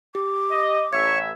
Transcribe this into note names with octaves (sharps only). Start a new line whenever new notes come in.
G4 D6
D#5
A1 C#5 E5 G#6